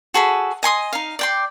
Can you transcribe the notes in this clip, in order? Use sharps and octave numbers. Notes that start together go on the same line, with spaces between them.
F#4 G#4 A4 B5
D#5 G#5 C6 D#6
D#4 F5
D5 G5 C6